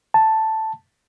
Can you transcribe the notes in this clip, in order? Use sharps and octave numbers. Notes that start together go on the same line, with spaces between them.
A5